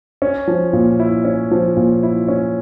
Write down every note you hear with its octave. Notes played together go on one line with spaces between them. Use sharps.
C#4
F3
A#2
E4
C#4
F3
A#2
E4
C#4